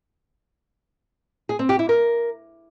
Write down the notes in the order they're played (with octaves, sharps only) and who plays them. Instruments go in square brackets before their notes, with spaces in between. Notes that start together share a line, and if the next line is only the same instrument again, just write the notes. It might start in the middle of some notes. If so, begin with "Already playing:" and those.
[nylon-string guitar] G#4
C4
G4
E4
A#4